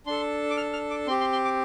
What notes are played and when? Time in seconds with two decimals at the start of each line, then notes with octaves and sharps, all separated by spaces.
0.06 D4 A4 C6
0.50 D6
0.57 F6
0.73 F6
0.90 D6
1.07 C4 C6
1.10 G4
1.21 C6
1.33 C6
1.45 D6